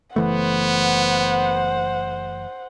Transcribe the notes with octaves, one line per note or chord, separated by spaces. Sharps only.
F#1 E3 A3 B3 C5 F#5